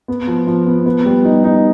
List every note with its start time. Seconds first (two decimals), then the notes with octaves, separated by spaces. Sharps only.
0.08 B3
0.28 F3
0.47 F3
0.67 B3
0.86 B3
1.06 G3
1.25 D#4
1.44 D#4